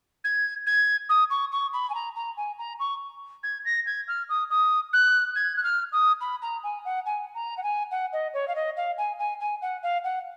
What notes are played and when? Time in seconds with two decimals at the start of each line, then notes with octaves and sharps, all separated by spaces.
0.24 G#6
0.66 G#6
1.09 D#6
1.30 C#6
1.52 C#6
1.73 B5
1.90 G#5
1.94 A#5
2.15 A#5
2.37 G#5
2.58 A#5
2.79 C#6
3.43 G#6
3.65 A#6
3.86 G#6
4.08 F6
4.29 D#6
4.50 D#6
4.93 F#6
5.35 G#6
5.56 F#6
5.63 F6
5.92 D#6
6.21 B5
6.42 A#5
6.63 G#5
6.85 F#5
7.06 G#5
7.34 A#5
7.57 F#5
7.63 G#5
7.91 F#5
8.12 D#5
8.34 C#5
8.48 F5
8.55 D#5
8.76 F5
8.98 G#5
9.19 G#5
9.40 G#5
9.62 F#5
9.83 F5
10.04 F#5